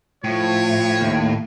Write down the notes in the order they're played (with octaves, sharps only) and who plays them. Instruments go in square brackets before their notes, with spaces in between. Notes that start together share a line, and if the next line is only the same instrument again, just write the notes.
[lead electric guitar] A2 [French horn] F3 [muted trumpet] C#5
[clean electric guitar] D#2